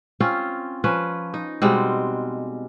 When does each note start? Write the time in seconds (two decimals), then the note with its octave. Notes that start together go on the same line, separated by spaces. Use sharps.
0.20 C4 C#4 F4
0.84 F3 C#4 B4
1.34 D#4
1.62 B2 G3 G#3 C4